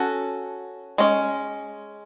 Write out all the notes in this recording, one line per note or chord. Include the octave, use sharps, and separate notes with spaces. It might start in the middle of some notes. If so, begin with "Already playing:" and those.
Already playing: C#4 F#4 A4
G#3 C#4